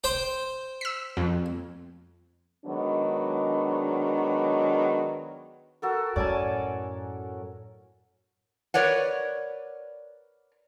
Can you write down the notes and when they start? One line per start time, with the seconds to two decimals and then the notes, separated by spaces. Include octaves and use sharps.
0.04 C5 G5
0.81 E6 B6
1.17 F2
2.66 D#3 F#3 G#3 B3 D4
5.82 F#4 A4 A#4
6.16 F#2 A2 C#4 D5 G#5 A5
8.74 A#4 B4 C#5 D5 F#5